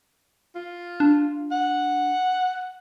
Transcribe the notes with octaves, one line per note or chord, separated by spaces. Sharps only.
F4
D4
F#5